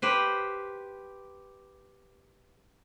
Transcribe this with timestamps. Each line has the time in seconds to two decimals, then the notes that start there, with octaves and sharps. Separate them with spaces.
0.02 G4 B4 C5